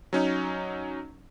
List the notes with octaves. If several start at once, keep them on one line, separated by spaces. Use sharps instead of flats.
F#3 C#4 D#4